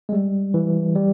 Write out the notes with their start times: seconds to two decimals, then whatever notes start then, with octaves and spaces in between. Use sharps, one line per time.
0.09 G#3
0.12 G3
0.54 E3
0.95 G3